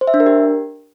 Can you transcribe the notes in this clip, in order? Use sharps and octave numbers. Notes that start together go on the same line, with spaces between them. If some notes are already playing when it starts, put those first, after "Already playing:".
C5
E5
D4
A#4
G4